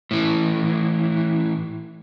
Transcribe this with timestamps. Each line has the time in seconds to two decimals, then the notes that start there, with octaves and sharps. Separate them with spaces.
0.11 A2 E3